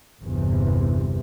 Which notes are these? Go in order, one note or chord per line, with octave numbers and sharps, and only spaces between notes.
G1 E2 C3 E3